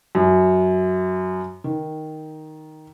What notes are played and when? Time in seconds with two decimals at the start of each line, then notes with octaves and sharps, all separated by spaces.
0.15 F#2
1.64 D#3